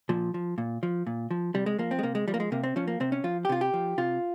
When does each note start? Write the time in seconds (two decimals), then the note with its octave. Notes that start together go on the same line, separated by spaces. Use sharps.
0.09 A#2 F3
0.34 F3
0.58 A#2
0.83 F3
1.07 A#2
1.31 F3
1.54 C3 G3
1.66 G#3
1.78 F3 A#3
1.91 C4
1.99 G#3
2.03 C3 A#3
2.15 G#3
2.28 F3 G3
2.34 A#3
2.40 G#3
2.52 C3 A#3
2.64 C4
2.76 F3 C#4
2.88 A#3
3.00 C3 C4
3.12 C#4
3.24 F3 F4
3.45 G4
3.49 C3 F4
3.61 G4
3.74 F3
3.98 C3 F4